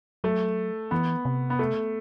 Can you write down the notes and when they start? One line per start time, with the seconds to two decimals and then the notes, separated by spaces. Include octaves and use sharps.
0.24 F#3 A3
0.91 E3 B3
1.25 C3
1.50 B3
1.59 A3